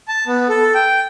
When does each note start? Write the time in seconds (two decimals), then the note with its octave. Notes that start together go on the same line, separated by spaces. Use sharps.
0.08 A5
0.27 B3
0.49 A4
0.75 G5